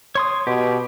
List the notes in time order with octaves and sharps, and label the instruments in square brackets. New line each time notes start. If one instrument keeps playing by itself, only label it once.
[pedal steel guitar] C#5 C6 D#6
[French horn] B2 [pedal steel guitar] G4